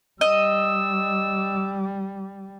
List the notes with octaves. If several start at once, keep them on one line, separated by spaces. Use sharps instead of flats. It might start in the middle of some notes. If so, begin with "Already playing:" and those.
G3 D#5 E6